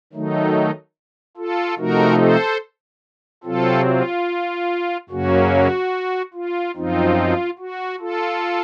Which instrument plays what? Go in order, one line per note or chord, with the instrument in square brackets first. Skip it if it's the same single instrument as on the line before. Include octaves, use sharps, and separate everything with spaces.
[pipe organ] D#3 F#3 A3 D#4
F4 A4
C3 F3 A3 D#4 F#4 A#4
A4 C5
C3 F#3 C4 F4 A4
F4
F#2 C#3 F#3 A#3 C#4 F#4
F4
F#2 F3 C4 D#4 F4
F#4
F4 A4